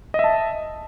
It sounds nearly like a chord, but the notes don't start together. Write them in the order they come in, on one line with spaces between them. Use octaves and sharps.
D#5 E5 A5